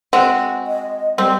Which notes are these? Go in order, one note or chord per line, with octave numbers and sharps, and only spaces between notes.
G#3 C4 F#4
D#5
G3 C4